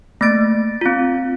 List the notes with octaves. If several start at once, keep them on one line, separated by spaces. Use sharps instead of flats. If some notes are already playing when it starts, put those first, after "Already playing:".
A3 A#3 A6 D7
C4 F4